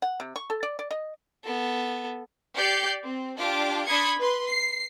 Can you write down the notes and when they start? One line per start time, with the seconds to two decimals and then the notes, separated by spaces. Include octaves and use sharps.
0.02 F#5
0.20 C3
0.36 C#6
0.50 A4
0.63 D5
0.79 D5
0.91 D#5
1.44 B3 A4
2.56 G4 D5 G6 C7 C#7
3.04 C4
3.38 D4 F4 G4 D6
3.86 D4 B5 C6 D#6 G#6 C#7
4.18 B4 C6
4.48 C7